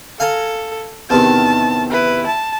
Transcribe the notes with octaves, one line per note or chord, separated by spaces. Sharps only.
A4 F5 G#5 A#5
E2 C3 D#3 A5
E4 B4
A5